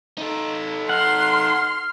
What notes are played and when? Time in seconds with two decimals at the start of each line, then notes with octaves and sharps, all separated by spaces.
0.18 D#4 A4
0.89 F#5 C6 F6